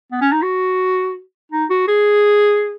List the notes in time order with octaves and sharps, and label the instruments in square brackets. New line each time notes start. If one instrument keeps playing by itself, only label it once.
[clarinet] B3
C#4
D#4
F#4
D#4
F#4
G#4